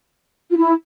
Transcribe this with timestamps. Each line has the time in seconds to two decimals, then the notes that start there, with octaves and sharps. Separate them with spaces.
0.50 F4
0.57 E4